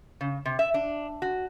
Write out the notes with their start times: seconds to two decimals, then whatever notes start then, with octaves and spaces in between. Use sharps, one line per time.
0.21 C#3
0.45 C3
0.59 E5
0.74 D4
1.22 F#4